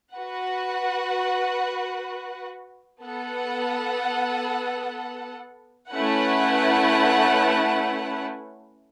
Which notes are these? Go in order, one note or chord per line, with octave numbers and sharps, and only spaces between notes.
F#4 B4 F#5
B3 A4 F#5
A3 C#4 E4 B4 F#5